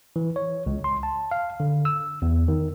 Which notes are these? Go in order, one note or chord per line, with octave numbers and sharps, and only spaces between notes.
E3
C#5
C#2
C6
A5
F5
D3
E6
E2
D#3